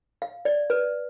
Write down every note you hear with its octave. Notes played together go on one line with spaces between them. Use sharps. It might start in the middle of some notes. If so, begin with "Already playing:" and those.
F5
D5
B4